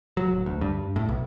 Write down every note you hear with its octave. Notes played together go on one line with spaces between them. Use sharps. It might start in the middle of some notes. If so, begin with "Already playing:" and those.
F#3
D1
D2
G2
A2
B1